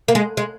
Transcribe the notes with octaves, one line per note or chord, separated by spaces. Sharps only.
A#3
G#3
G#3